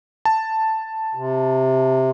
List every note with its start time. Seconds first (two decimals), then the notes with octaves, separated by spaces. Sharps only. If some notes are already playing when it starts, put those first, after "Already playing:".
0.25 A5
1.15 C3